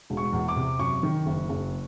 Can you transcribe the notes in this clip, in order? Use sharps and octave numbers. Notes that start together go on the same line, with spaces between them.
E1
C#6
E2
D6
C3
F#2 C#6
D#3
F#1
F#1